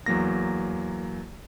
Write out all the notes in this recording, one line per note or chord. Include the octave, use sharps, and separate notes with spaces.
E2 F#3 A#3 A#6